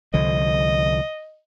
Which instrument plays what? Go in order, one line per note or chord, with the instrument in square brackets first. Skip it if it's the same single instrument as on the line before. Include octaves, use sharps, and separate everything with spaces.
[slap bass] C2 D3 F3 [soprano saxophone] D#5